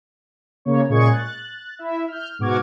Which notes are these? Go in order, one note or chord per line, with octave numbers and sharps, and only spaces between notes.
C#3 A#3 C#5
A#2 C#3 G#3 G#4 C#6 G#6
F#6 A6
E4 E5
F6 G6
G#2 B2 F#4 D6 F6 G#6